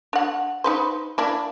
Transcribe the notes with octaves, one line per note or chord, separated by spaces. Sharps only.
D4 F#5
D#4 B4 C5
A#3 D4 E4